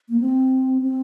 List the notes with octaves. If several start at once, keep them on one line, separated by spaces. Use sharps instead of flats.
A#3
C4
C4